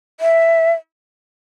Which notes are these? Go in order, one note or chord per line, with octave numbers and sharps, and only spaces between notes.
E5